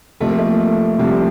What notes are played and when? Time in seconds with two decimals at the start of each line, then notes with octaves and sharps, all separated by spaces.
0.20 C2 C3 F3 A3
0.29 A#3
0.38 A3
0.99 C2 C3 F3 G3